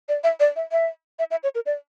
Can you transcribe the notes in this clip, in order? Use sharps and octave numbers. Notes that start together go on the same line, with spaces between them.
D5
E5
D5
E5
E5
E5
E5
C#5
A#4
D5